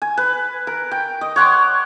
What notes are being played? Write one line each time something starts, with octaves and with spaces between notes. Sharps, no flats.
G#5
B4
A#4
G5
D#5
C#5 F#5 C6 D6